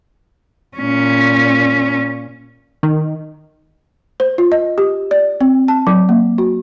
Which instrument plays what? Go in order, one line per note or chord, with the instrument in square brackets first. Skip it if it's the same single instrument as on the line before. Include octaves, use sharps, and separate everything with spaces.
[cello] A#2 C#4
[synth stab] D#3
[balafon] C5
F4
D#5
G4
D5
C4
A5
F#3
A#3
F#4